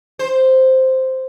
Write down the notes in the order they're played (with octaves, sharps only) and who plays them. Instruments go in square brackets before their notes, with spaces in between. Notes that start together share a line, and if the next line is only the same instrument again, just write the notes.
[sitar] C5